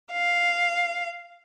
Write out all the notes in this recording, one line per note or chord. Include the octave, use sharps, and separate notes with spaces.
F5